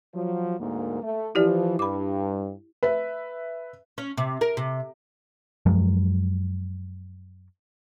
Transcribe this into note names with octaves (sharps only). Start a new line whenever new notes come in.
F3 F#3
D2 G#2 A#3
A3
E3 F3 E4 G4 D5
G2 B5 D6
B4 E5
C#4
C3
A#4
C3
F#2 F3 F#3 G#3